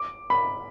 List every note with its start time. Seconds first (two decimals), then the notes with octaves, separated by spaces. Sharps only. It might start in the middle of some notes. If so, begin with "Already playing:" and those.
Already playing: D6
0.30 B5